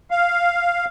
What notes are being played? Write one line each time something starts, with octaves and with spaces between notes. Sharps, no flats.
F5